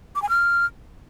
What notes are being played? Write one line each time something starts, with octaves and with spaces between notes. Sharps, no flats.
D6
G#5
F6